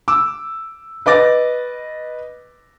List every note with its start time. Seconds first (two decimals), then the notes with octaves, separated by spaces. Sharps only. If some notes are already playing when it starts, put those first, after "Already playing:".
0.08 D6 E6
1.06 B4 D#5 D6 A6 A#6